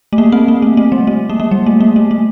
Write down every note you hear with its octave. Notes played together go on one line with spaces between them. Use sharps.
A3
A#3
C4
A#3
A3
A3
G3
A3
A#3
A#3
G3
A3
A#3
A3
A3